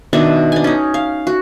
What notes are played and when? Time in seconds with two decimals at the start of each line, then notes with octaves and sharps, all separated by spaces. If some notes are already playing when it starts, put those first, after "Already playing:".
0.13 B2 D#3 D4 E5
0.52 D4 G#5
0.64 C#4 D#4
0.94 F5
1.27 F#4